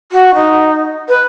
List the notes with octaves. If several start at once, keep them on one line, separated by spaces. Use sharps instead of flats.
F#4
D#4
B4